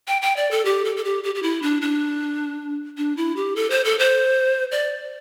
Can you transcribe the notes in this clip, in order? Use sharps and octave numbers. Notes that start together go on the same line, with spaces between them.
G5
G5
D5
A4
G4
A4
A4
G4
G4
G4
E4
D4
D4
D4
E4
G4
A4
C5
A4
C5
D5